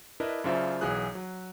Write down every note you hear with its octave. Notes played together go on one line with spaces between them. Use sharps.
D4 E4 A#4 B4 D#5
F#2 C#3 D4 F4 C5 E5
B1 E3 F#3 G#4 F#6
F#3